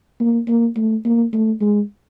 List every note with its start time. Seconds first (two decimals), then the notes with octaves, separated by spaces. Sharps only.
0.20 A#3
0.48 A#3
0.76 A3
1.05 A#3
1.33 A3
1.61 G#3